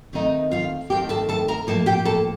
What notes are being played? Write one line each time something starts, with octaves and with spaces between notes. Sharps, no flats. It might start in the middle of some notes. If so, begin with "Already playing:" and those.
D#2 D#3 A3 C4 D#4 D#5
F4 F5
D#2 D#3 A3 C4 G4 G5
A4 A5
A4 A5
A#4 A#5
A2 F3 A#3 A4 A5
G4 G5
A4 A5